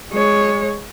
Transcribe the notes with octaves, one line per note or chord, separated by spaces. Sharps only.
G#3 C#5